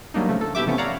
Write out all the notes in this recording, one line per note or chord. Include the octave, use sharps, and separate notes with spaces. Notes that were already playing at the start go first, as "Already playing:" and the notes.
F#3 G3 A#3 D4 D#4
C#3 F3 A3
A4
B2 E4 G4 E5 D6
C3 E3 F3 A3 B3 C#4
C#5 D5 F5 F#5 A#5